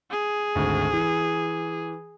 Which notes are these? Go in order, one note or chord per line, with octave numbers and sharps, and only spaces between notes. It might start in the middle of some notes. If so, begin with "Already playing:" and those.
G#4
G#1 D2
E3